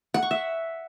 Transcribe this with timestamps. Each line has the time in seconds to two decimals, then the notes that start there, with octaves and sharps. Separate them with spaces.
0.14 F#5
0.23 C#6
0.31 E5